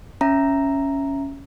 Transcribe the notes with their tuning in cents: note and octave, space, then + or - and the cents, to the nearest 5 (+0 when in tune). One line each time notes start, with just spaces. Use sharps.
C#4 +0 E5 +5 A#5 +0